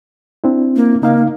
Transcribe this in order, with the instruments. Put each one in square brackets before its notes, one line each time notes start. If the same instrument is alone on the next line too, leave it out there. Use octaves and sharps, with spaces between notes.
[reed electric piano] C4 D4 E4
[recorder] A#3
[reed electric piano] C#3 D#4 F5 [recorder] A#3